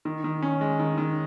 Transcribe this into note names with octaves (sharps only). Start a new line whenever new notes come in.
D#3
D#3
C#4
G#3
D#3
D#3